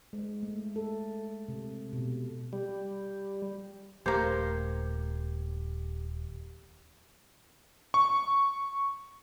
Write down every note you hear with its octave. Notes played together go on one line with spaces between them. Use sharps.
G#3
A3
A4
C3
B2
G3
D#1 A3 A#3 G4 C5
C#6